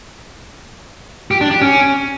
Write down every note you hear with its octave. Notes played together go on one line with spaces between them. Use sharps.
G4
D4
G4
C#4